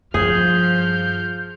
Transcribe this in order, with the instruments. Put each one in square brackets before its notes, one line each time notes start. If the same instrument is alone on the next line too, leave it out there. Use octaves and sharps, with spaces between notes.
[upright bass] G2 [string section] F3 [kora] G#4 [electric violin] F6 G6